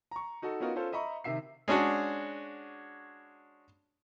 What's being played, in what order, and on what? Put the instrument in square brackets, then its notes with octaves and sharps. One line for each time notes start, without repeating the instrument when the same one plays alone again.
[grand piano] A#5 C#6
D#4 F#4 A4
B3 C#4 D#4 F4 F#4 A#4
C#4 F4 A4 C5
D#5 E5 A#5 B5 C#6
C3 D#3 E5 C7
[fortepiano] G#3 C#4 D4 F#4